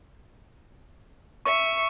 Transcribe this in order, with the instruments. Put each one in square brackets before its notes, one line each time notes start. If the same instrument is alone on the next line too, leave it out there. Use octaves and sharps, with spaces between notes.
[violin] E5 C#7 [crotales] C#6